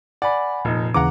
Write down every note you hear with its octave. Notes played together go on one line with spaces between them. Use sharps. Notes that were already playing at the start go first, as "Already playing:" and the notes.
D5 F#5 G#5 B5
F1 A#2 D#4
D#2 C#3 E3 F#5 A#5 D6